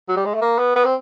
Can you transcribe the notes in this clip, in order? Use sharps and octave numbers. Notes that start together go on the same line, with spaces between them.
F#3
G3
G#3
A3
A#3
B3
B3
C4